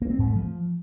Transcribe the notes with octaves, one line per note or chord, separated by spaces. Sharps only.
A#3
C4
G#2
A3
F3